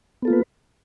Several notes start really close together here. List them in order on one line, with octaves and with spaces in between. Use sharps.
B3 A4 F4 A#3 B4